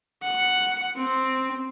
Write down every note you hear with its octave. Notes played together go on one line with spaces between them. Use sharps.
F#5
C4